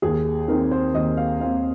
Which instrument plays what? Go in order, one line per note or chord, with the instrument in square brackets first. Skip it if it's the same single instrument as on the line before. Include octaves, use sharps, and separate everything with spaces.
[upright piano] D#2 G#4
D#3 C4 D#4 A#4
C5
D#2 D#5
F5
D#3 C4 D#4 F5